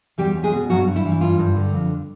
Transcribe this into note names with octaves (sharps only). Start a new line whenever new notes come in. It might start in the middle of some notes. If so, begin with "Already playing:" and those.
E2 G3 G4
C#4
G#3 G#4
B2
G2 F#3 F#4
G2
E4
E3
E4
G2 F4
G2
D3
F2